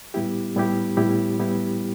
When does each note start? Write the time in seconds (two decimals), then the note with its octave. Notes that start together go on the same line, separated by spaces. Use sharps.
0.14 A2 G3 B3 E4 G4
0.56 A2 G3 B3 E4 G4
0.97 A2 G3 B3 E4 G4
1.39 A2 G3 B3 E4 G4